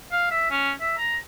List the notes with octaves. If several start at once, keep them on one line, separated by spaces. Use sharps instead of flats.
F5
E5
C#4
E5
A#5